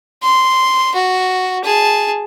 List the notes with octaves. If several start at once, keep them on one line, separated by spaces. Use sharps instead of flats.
C6
F#4
G#4 A5